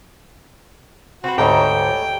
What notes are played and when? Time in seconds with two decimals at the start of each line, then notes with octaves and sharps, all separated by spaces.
1.24 C4 F#4 B4
1.38 D2 G#2 G3 A4 C#5 D#5 G5 A#5